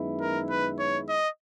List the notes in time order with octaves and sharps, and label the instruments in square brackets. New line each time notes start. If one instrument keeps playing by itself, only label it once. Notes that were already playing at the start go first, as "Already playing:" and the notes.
Already playing: [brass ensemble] F#2 D#3 G#3 B3 E4
[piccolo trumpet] A#4
B4
C#5
D#5